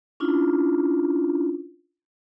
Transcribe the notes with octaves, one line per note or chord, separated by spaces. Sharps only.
C#4 D4 E4 F4